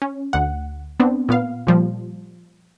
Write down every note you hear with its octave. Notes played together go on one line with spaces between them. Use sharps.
C#4
D2 F#5
B3 C4 D4
A#2 B3 F5
A#2 F3 G3